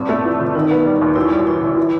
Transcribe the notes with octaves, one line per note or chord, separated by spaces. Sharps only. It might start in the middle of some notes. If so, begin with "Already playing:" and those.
Already playing: A1 G2 C4
A3
E3
G1
D#3 D#4
B3
G3
D#2
F#2 E4
G3
E3 E4
G1
E3